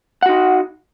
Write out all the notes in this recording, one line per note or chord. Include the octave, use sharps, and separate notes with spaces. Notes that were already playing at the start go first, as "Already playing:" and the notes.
D#4 F#4 F#5